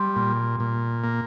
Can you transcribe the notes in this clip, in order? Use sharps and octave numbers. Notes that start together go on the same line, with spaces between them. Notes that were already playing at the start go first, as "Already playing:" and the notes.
Already playing: G3 C6
A#2
A#2
A#3